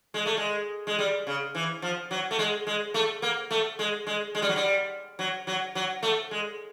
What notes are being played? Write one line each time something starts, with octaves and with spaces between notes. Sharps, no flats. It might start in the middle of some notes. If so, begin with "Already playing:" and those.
G#3
A3
G#3
G#3
G3
C#3
E3
F3
F#3
A3
G#3
G#3
A3
A#3
A3
G#3
G#3
G#3
G3
F#3
G3
F#3
F#3
F#3
A3
G#3